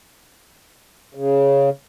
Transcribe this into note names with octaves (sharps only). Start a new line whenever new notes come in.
C#3